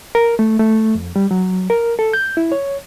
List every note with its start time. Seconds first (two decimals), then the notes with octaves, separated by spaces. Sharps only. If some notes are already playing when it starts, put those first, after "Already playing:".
0.15 A#4
0.39 A3
0.59 A3
0.95 F2
1.16 G3
1.31 F#3
1.70 A#4
1.99 A4
2.13 G6
2.37 E4
2.52 C#5